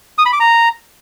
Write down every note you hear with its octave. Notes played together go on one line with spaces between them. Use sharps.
D#6
B5
D6
A#5